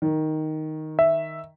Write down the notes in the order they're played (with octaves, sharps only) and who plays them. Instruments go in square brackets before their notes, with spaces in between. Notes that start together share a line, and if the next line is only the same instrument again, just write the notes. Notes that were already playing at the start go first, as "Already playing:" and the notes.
[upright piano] D#3
[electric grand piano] E5